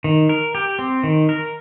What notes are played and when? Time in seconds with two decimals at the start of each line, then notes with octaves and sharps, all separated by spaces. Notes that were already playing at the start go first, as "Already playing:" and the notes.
0.04 D#3
0.29 A#4
0.55 G4
0.79 C4
1.04 D#3
1.29 A#4